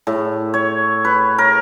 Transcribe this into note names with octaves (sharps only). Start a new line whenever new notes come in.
A2
C#5
B4
A#4